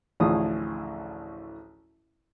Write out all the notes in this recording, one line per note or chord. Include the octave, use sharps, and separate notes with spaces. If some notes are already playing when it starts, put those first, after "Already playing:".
A1 D2 A2 F3 G#4 D#6